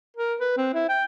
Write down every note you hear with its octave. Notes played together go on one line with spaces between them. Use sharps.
A#4
B4
C4
E4
G5